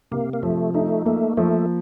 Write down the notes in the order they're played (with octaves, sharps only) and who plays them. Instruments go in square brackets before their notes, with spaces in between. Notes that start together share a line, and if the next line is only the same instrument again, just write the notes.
[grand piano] C3 [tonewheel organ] A#3
[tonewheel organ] A#3
[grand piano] F3 [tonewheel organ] A3
[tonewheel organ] A3 [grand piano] D#4
[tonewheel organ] A3 [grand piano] A#3
[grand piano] F3 [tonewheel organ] A3